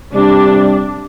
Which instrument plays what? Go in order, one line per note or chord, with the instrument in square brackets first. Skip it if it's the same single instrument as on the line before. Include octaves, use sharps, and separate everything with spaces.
[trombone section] C3 G3 [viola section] D4